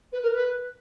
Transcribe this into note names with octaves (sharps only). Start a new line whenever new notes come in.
B4
A#4
B4